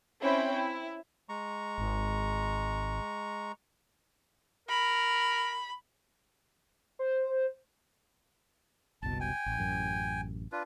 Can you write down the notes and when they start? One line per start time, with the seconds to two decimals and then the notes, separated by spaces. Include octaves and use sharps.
0.20 C4 C#4 E4 G5 B5
0.54 E4
1.29 G#3 A#5 C#6
1.78 G#1
4.69 A#4 B5
6.99 C5
9.02 F#1 C2 B2 A5
9.20 G5 G#5
9.46 A1
9.58 A1 F#2
10.52 D4 F4 B4